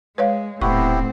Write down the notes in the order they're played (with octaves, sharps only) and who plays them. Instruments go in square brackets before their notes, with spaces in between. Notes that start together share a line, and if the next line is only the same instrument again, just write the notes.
[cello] G#3 [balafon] B4 C#5 F5
[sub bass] D#1 [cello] A2 C4 [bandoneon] B3 E4 G4 [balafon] C#6